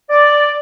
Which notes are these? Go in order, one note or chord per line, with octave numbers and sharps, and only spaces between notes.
D5